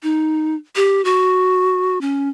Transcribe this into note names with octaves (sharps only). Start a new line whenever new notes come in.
D#4
G4
F#4
C#4